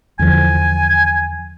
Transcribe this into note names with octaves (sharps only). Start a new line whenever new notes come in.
E2 D3 F3 G#5